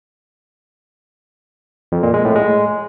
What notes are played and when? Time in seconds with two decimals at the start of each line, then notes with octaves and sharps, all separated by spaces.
1.92 F2
2.03 A#2
2.14 G#3
2.25 A2
2.35 G#3